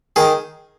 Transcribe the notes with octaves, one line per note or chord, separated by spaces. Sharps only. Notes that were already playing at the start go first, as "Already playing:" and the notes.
D#3 G#4